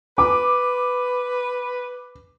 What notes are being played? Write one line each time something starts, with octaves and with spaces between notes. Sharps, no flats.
B4 D6